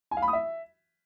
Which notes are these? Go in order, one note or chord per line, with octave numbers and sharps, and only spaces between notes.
G#5
F5
B5
D#6
E5